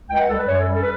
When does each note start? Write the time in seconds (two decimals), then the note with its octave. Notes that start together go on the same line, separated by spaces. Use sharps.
0.09 C#2 G5
0.19 F#5
0.28 G3 A4
0.39 B4
0.47 F#2 C#5
0.60 A4
0.67 G3
0.74 A4
0.81 B4